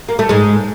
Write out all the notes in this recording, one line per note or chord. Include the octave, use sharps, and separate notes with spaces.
A#3
A3
G#2 G#3